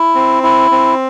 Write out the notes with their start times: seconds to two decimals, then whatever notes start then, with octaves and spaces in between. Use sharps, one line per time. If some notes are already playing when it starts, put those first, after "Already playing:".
Already playing: E4
0.15 C4
0.43 E4
0.71 C4